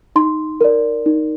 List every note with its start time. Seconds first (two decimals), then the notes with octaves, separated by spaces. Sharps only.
0.16 D#4 C6
0.61 A#4 D5
1.06 D#4